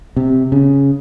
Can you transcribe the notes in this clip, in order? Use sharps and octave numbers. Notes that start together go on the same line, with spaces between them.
C3
C#3